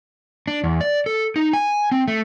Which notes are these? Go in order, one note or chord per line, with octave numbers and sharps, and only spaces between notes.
D4
E2
D5
A4
D#4
G#5
C4
A3